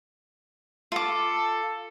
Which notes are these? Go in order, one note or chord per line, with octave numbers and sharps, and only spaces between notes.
F4 A4 D6